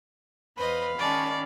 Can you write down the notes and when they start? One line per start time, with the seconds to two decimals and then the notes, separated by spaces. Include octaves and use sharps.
0.57 E2 B4 C5 D#5 F5 B5
0.99 D#3 G#3 C#4 D5 A5